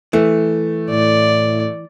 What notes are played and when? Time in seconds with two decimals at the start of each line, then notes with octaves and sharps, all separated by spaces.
0.13 E3 A3
0.90 A2 D5